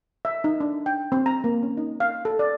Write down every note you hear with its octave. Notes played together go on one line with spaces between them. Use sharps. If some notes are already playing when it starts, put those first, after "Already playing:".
E5
D#4
D4
G5
C4
A#5
A#3
C#4
D#4
F5
A4
D5